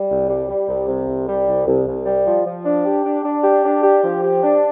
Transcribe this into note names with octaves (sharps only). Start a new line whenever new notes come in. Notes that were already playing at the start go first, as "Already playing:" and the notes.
Already playing: G3
C2
G3
G3
C2
C3
C2
G3
C2
C2
C2
G3
F3
F3
D4
G4
D4
D4
G4
D4
G4
F3
G4
D4